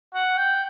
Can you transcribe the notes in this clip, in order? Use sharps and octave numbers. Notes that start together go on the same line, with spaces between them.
F#5
G5